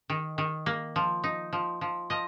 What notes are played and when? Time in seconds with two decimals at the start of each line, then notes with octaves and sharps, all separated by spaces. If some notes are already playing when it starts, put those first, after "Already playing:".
0.10 D#3
0.38 D#3
0.66 A#3
0.96 F3
1.24 D#4
1.53 F3
1.81 F3
2.10 F3 D#5